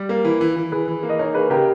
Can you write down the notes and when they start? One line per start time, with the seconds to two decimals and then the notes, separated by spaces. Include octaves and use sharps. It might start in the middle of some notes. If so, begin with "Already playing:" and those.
Already playing: G3
0.09 A#3
0.25 E3
0.41 E3
0.56 E3
0.72 E3 G#4 B4
0.88 E3
1.03 A#3
1.09 D#5
1.19 D#4 A#4 C#5
1.35 A#3 G#4 B4
1.50 C#3 G4 A#4